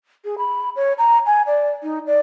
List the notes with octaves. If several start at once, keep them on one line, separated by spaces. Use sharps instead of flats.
G#4
B5
C#5
A#5
G#5
D5
D#4
D5